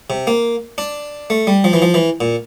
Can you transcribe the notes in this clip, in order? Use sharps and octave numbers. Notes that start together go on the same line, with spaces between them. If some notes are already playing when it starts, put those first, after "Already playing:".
C3
A#3
D4
A3
G3
F3
E3
F3
E3
A#2